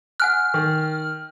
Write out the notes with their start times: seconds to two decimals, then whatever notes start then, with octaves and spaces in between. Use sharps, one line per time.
0.20 F#5 G#5 F6 F#6
0.54 D#3